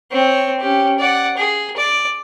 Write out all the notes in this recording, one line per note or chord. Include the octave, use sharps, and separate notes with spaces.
C4 C#5
C#4 G4
D5 F#5
G#4
D5